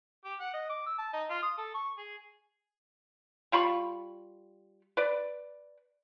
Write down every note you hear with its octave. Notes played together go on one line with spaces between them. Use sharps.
G4
F#5
D#5
D6
E6
A5
D#4
F4
D#6
A4
C#6
G#4
G3 F4 B5 C#6
B4 D5